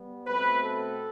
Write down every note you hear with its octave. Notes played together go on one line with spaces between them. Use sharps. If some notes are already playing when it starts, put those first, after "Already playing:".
Already playing: G3 B3
B2 A3 C4 B4
A4